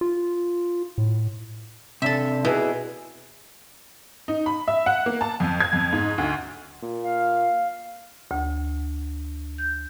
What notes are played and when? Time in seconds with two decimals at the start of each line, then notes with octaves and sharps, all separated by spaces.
0.01 F4
0.98 A2
2.02 C3 D4 A4 E5
2.45 B2 E4 G#4
4.28 D#4
4.46 B5
4.68 E5
4.86 F#5
5.06 A#3
5.21 A5
5.40 F2
5.60 G#6
5.73 F2
5.93 G#2
6.18 D2
6.82 A#2
7.05 F5
8.31 D2
9.58 G6